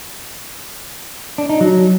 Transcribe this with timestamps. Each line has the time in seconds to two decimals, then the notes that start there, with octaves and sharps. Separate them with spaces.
1.38 D4
1.49 D#4
1.61 F#3